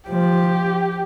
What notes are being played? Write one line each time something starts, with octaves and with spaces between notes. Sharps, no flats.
F3 G4